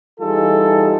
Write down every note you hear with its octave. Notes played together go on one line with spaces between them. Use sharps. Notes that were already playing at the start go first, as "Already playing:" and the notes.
E3 G3 D#4 F4 G#4 A4